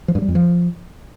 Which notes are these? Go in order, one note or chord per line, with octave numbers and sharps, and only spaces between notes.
F3
G2
G3
F2
F3